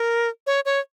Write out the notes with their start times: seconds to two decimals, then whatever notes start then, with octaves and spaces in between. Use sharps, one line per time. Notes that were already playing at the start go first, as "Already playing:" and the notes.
Already playing: A#4
0.47 C#5
0.65 C#5